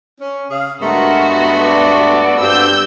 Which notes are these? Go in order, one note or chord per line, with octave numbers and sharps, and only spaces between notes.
C#4
C#3 G#4 F5
G2 G#3 A3 B3 F#4 A#4
A4 D5
G2 C4 D5 E6 G6